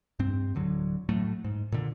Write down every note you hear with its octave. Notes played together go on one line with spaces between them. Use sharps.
G2 C4
D1 D3 F#3
A2 F#3 A3
G#2
A#2 D3